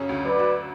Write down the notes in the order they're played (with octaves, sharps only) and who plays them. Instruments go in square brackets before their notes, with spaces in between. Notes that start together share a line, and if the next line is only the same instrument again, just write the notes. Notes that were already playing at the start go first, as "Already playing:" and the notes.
Already playing: [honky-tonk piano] F#2 C#3 C#4
D2
[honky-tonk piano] F#3 [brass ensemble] B4 D5
[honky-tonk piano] F#4